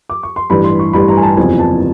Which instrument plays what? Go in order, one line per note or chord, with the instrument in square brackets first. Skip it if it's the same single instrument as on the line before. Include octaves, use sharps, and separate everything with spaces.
[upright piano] D6
C#6
C6
A1 G2 E3 G3 B5
C6
C#6
A1 G2 E3 G3 B5
A#5
G#5
A5
F#1 E2 C3 F3 G#5
A5